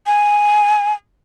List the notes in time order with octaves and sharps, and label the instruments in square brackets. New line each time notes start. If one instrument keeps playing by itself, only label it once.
[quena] G#5